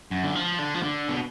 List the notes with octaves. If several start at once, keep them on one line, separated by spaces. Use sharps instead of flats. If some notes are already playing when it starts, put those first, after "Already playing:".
F#2
D3
F3
D3
F3
D3
B2